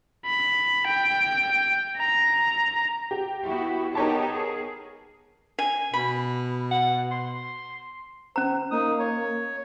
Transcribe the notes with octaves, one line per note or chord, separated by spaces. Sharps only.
B5
G5
A#5
G4
B3 E4 F#4
B3 D#4 G4 A#4 C#5 A5
G#4
G#5
B2 B5
F#5
C6
C#4 C5 A#5
A#3 D#4 D#6
C#5